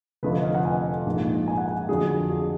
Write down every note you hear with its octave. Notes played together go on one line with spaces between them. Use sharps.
F1 F2 D3 F3 B4
D#5
F5
F#5
G#5
A#1 G#2 F3 G#3
G#5
F#5
G#5
F2 D3 F#3 D4 G#4
G#4